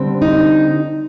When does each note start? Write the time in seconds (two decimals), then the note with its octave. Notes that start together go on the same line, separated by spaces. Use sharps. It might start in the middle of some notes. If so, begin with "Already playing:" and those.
Already playing: D3 G3 C4
0.22 D#4